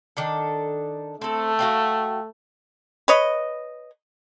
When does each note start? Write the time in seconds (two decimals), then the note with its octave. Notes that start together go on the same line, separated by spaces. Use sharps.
0.17 D#3 D4 A4
1.22 A3 C4 A4
1.59 F#4 F5 G5
3.08 B4 C#5 D#5